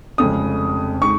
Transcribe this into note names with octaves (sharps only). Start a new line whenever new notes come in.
F1 F2 C#3 G#3 D#6
G#3 D#4 C#6